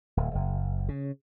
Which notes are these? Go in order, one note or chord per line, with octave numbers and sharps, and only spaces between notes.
D1
F#1
C#3